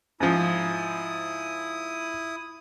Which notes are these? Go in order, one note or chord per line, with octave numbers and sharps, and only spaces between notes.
G#2 F3 E4 D#6